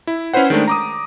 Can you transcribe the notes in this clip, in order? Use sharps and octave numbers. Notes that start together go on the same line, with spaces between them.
E4
C#4 E4 B4 C5 F#5
D#3 G#3 A3 D4
A#5 D6 D#6